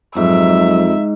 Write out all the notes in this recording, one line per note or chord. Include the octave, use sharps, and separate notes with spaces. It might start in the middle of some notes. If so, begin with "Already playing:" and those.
F2 G#2 F#3 E5